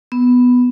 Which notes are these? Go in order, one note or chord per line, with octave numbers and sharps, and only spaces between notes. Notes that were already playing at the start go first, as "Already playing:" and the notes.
B3